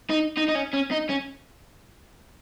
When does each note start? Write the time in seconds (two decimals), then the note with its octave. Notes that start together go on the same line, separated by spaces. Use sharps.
0.10 D#4
0.37 D#4
0.48 D#4
0.55 C#4
0.73 C#4
0.91 D#4
1.09 C#4